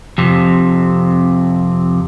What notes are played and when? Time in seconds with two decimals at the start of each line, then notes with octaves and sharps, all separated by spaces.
0.18 F2 C3